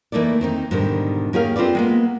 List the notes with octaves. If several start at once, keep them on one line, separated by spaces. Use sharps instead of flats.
E3 A3 A#3 D#4 D5
D#3 C4 D#4
G#2 B2 D3 D#3 G3
A#3 C#4 G4 G#4 A#4 F5
C4 F4 A4 B4 D5
G#3 A#3 B3